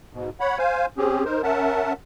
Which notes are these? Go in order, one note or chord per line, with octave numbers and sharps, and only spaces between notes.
G#2 B2
C#5 F#5 B5
C5 F5 G#5
C4 C#4 G4 G#4
D#4 A#4 C5
C#4 A#4 E5 F#5 A5